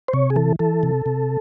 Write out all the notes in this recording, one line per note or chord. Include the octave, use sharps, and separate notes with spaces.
C5
C3 C#5
G#4
E3 A4
E3 A4
C3
C3